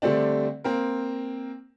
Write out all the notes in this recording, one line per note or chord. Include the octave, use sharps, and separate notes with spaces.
D3 G3 A3 C4 D4
A#3 C4 A#4